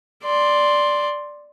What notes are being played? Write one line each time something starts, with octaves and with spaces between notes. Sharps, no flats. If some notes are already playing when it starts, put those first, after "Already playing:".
D5 C6